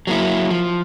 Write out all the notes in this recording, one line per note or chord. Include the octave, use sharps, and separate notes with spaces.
F#3 A#3 E4
F3